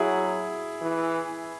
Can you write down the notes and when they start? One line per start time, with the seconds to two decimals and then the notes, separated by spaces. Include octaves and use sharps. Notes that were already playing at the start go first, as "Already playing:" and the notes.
Already playing: F#3 E4 G#4
0.82 E3